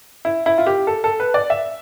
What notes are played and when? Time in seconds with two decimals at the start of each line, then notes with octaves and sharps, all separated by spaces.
0.25 E4
0.46 E4
0.58 F4
0.67 G4
0.87 A4
1.04 A4
1.20 B4
1.34 D5
1.50 E5